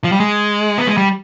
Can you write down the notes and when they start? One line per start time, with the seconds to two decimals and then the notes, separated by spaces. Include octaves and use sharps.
0.04 F3
0.12 G3
0.20 G#3
0.78 B3
0.88 G#3
0.97 G3